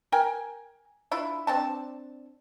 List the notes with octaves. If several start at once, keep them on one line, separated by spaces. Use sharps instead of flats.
A#4 G5 G#5
D4 E4 F4
C4 D4 A5